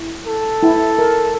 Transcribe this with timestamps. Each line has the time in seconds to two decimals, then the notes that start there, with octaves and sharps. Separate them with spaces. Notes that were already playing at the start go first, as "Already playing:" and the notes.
Already playing: E4
0.26 A4
0.63 E4
0.99 A#4